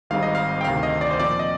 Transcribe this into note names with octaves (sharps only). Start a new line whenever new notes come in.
G#1 G#2 G3 C4 D#4 F5
D#5
F5
G5
D2 C3 D#3 F5
D#5
D5
C5
A#2 F3 C4 D5
D#5